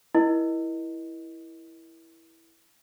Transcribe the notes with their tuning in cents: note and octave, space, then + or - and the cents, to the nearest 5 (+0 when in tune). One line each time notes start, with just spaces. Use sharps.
E4 +0 A#4 +35 D#5 +0